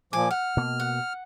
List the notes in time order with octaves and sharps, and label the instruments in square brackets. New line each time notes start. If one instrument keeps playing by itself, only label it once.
[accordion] A#2 F3 D6 [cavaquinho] G#5
[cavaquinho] F#5 [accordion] F6
[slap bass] B2 A#3
[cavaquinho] F#5